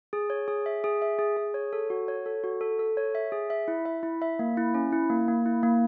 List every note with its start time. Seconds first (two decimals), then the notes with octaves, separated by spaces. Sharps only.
0.13 G#4
0.30 C#5
0.48 G#4
0.66 E5
0.84 G#4
1.02 E5
1.19 G#4
1.36 G#4
1.54 C#5
1.73 A4
1.90 F#4
2.08 C#5
2.26 A4
2.44 F#4
2.61 A4
2.79 A4
2.97 C#5
3.15 E5
3.32 G#4
3.50 E5
3.68 E4
3.86 E5
4.03 E4
4.22 E5
4.39 A#3
4.57 E4
4.74 C#4
4.92 E4
5.10 A#3
5.28 A#3
5.46 E4
5.63 A#3